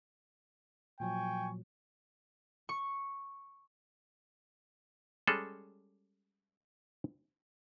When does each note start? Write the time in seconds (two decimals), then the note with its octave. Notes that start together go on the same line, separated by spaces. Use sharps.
1.00 A#2 F3 F#3 G5 G#5 C#6
2.69 C#6
5.27 G3 G#3 C#4 G#4 A4